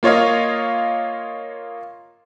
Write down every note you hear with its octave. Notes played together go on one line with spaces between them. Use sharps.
A#3 F4 C#5 D#5 F5